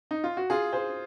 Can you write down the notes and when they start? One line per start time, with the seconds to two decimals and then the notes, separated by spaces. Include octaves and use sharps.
0.11 D#4
0.24 F4
0.37 F#4
0.50 F4 G#4
0.73 G#4 C5